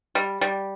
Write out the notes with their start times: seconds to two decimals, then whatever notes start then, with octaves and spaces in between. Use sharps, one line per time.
0.15 G3
0.41 G3